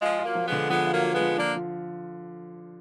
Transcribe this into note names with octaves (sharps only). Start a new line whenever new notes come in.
F3 G#3 F4
F#3 A#3 F4
F3
G#3 B3
D3
F3 G#3 B3
F4
F#3 A#3
F4
G#3 B3
F3
F3 A#3 D4
F3